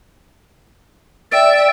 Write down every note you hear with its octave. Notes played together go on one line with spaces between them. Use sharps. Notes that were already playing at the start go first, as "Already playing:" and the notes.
D5 E5 G5